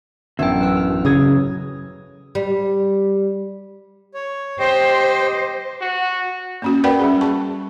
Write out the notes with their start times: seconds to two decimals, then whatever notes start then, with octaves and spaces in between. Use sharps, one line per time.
0.39 A1 F#2 F#3 B3 D4 E5 G5
0.61 B4 E6
0.77 F6
1.05 C#3 A#5 D#6 G#6
2.35 G3
4.14 C#5
4.59 G4 C5 D#5 G5
5.81 F#4
6.62 A#3 C#4 F#4
6.84 A#4 B4 D5 F#5 G5 B5
6.99 G3 C#4 G#4
7.21 G#4 A5 C#6